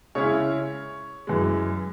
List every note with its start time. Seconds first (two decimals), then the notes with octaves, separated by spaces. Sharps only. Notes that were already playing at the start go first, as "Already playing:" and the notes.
0.15 C#3 G#3 C#4 E4 C#5
1.27 F#2 E3 G#3